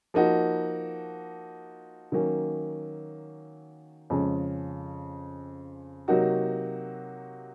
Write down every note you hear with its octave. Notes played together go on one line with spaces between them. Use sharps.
F3 A#3 D#4 F#4
D#3 F#3 A#3 C#4
F2 C#3 G#3 C#4
C3 F#3 A#3 D#4 F#4